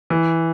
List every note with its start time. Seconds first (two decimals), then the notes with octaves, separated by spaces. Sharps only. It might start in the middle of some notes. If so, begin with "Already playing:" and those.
0.10 E3